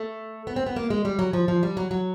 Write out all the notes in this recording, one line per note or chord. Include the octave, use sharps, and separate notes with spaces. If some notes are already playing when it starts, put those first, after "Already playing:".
Already playing: A3
B3
C4
B3
A#3
G#3
G3
F#3
F3
F3
G3
F#3
F#3